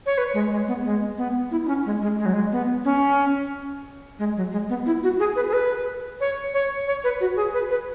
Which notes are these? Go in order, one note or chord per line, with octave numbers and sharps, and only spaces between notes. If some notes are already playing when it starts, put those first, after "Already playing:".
C#5
B4
G#3
G#3
B3
G#3
B3
E4
E4
C#4
G#3
G#3
G#3
F#3
G#3
B3
C#4
G#3
F#3
G#3
B3
E4
F#4
G#4
B4
G#4
B4
C#5
C#5
C#5
B4
F#4
G#4
B4
B4